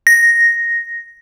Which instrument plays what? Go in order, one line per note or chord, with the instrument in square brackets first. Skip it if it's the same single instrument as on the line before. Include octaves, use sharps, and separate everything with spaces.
[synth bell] A#6